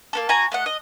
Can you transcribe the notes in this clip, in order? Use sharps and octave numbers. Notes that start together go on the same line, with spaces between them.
A#3 B3 A4
F#4 G#5 A#5
A3 D#5 F#5
D#5